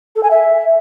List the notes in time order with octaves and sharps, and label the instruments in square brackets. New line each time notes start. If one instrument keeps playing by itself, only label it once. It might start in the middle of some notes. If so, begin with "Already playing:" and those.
[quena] A4
G#5
E5